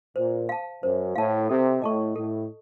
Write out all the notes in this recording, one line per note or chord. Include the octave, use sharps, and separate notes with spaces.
A#2 C5
F5 A5
F#2 C5
A2 F5 A5
C3 A4
A2 D#5 A5 C#6
A2 A4